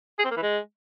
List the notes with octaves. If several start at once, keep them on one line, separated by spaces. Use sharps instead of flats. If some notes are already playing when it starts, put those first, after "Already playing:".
G#4
C4
A#3
E3
G#3